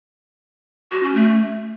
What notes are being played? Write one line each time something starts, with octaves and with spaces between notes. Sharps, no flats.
F#4
C#4
A3